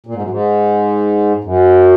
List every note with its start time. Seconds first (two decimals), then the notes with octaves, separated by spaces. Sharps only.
0.06 A#2
0.14 G#2
0.22 F#2
0.30 G#2
1.44 F#2